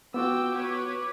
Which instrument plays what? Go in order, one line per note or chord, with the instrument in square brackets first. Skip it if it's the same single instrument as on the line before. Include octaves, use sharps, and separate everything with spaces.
[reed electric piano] B3 F4 F#4 [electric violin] G5 E6 [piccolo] D6
[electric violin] B4 C#5